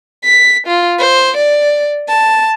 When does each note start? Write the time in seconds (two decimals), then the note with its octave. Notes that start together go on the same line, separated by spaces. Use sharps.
0.24 B6
0.67 F4
0.99 C5
1.37 D5
2.09 A5